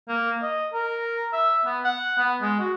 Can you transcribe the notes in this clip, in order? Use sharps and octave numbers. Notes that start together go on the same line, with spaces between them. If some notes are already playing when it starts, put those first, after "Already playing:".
A#3
D#5
A#4
E5
B3
F#5
B3
G#3
F#4